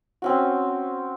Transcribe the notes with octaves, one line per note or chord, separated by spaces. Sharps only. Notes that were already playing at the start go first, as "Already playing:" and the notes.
C4 C#4 F#4